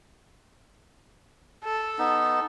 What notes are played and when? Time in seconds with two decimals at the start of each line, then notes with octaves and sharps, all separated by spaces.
1.64 A4
1.99 B3 D#4